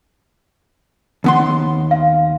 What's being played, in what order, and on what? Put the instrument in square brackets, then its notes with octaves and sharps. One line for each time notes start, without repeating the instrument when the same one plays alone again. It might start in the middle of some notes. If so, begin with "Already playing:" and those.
[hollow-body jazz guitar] D#2 B3 C6
[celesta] F5